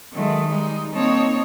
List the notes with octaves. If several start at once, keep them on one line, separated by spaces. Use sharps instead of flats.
D#3 F#3 G#3 A3
G3 G#3 D#4
A#3 C4 D#4 C#5 A5